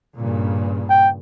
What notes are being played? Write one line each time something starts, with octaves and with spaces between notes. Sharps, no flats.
G2 A#2 C#3
G5